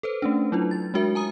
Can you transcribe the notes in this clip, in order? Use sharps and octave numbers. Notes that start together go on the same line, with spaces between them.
A4 B4 C5
A3 C#4 D4
F#3 D4 E4 F4
A6
G#3 D4 F#4 A#4 E5
G#5 A#5 D#6